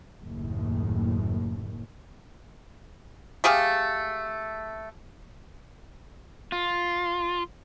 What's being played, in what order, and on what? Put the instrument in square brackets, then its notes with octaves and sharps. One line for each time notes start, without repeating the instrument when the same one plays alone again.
[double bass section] F#1 D#2 A2
[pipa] A3 G4 G#4 F5
[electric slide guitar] F4